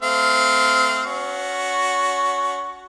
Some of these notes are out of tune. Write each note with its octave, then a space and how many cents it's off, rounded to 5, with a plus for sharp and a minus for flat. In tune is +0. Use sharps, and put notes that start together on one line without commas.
A3 +0 C4 -20 F5 +0
C#4 +30 F#4 +0